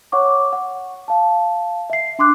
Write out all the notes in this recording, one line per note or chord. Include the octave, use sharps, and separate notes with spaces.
C#5 F#5 C#6 D6
F#5
F5 A5
E5 C7
D4 C6 D6 F#6